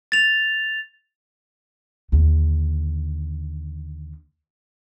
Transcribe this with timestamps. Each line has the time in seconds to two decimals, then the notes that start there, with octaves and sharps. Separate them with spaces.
0.12 A6 F7
2.12 D#2 D3